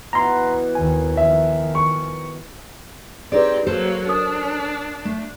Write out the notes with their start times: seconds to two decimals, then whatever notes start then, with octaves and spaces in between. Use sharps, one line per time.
0.13 B2 E3 A#5 C6
0.75 D#2 D#3 G#5
1.17 D#3 F3 E5
1.75 C#6
3.32 C4 D#4 G4 G#4 B4 C#5 D5
3.67 F#3 A#3 A4 C5
4.08 D4 A#4 D#6
5.05 A3